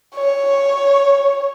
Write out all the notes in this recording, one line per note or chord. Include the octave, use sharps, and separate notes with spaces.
C#5